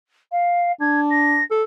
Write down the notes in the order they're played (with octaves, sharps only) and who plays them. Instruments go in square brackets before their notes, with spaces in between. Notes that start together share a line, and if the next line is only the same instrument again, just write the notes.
[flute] F5
[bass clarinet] D4 [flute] G#6
[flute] A#6
[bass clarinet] A4